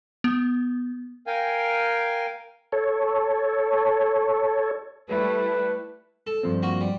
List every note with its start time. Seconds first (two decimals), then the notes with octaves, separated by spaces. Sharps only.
0.24 B3
1.27 A#4 F5 G5 G#5
2.72 A4 C#5
5.09 G3 A3 E4 B4
6.27 A4
6.43 G2 F3 C4
6.63 A#3 F#4
6.81 G3